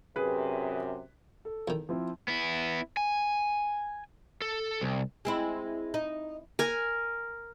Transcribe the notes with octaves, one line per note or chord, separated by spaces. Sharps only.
F#2 C3 G#4 B4
A4
E2 D#3
F3 C4 E4
B3 E4
G#5
A4
C2
G#3 C4 E4
D#4
A#4 G#5